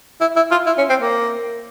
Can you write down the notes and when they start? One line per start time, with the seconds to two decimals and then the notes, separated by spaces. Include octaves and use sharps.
0.21 E4
0.36 E4
0.51 F4
0.66 E4
0.78 C#4
0.89 C4
1.01 A#3